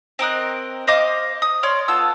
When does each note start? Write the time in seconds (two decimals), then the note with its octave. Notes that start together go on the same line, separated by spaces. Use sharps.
0.19 C4 A#4 D#5 F#6
0.87 C5 D#5 F5 D6
1.42 D#6
1.63 C#5 D5 C6 F6
1.88 B3 F4 A4 E6